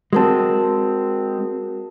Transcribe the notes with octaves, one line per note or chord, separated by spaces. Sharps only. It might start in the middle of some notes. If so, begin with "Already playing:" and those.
G#3 C4 F#4 A#4 A5